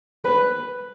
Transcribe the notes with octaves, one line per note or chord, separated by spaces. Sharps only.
B4